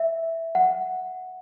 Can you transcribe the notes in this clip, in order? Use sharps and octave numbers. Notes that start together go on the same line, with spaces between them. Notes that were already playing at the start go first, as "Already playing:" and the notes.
Already playing: E5
F#5